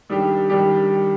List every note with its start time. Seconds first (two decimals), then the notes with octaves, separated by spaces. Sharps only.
0.10 D#3 G3 D4 G4
0.50 D#3 G3 D4 G4